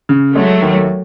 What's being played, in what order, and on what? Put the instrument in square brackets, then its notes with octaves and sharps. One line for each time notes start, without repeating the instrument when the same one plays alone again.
[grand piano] C#3
[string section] F#3 A3 [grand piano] G#3
[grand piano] D#2